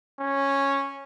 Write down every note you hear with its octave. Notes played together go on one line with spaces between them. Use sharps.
C#4